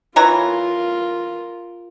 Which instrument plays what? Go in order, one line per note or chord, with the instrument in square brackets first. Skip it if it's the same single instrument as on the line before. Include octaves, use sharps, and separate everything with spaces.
[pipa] E3 C#5 A#5 [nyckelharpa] F4 A#4